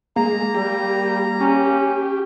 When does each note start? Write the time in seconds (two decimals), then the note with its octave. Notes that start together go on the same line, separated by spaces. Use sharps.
0.16 G#3 A#3 A#5
0.55 G3 G4
1.41 C#4 G4